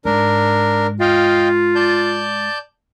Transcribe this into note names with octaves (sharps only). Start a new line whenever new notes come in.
G#2 D4 A#4
F4 D#5 F5 G5
D5 A5 G6